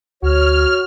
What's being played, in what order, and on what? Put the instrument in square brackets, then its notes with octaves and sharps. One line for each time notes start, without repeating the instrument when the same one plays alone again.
[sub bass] D2 [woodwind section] F#4 C#5 [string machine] F6